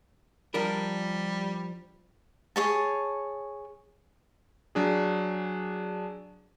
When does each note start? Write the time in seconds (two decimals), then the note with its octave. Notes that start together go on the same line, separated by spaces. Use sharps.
0.54 F3 G3 D4 A#4
2.56 G#4 C#5 A5
4.75 F#3 D4 G#4